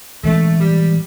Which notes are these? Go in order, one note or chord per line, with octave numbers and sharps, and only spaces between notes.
A2 E3 G#3 A3 C#4
G3